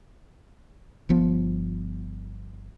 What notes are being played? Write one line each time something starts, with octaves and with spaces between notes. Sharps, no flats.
G1 F3 B3